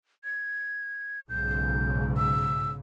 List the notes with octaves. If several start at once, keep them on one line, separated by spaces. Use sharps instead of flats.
G#6
B1 G#2 C#3 G6
E6